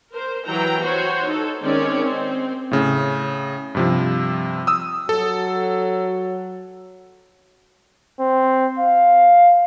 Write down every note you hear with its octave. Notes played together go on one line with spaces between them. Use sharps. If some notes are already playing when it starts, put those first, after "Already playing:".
A#4 C5
E3 F#3 G5 A#5
F#4 C5 C#5
D#4 A4
D#3 G#3 C4 C#4 C#5 D5
C4
A2 C#3
G2 C3 F3
D#6 E6
F#3 A4
C4
F5